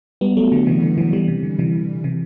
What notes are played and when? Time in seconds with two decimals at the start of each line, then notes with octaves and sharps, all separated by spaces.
0.21 G3 B3
0.37 F#3 A3
0.52 D3 F#3
0.67 C3 E3
0.83 D3
0.98 C3 E3
1.13 E3 G3
1.28 C3
1.43 D3
1.59 C3 E3
2.04 C3 E3